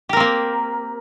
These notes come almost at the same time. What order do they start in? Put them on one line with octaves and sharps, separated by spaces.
G4 A#4 C4 A#3